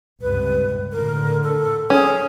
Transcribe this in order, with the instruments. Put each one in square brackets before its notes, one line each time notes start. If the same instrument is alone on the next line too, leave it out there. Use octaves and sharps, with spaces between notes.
[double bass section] C#2 G2 C3 [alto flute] B4
[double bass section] A2 D3 [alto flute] A#4
[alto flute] A4
[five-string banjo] C#4 [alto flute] G#4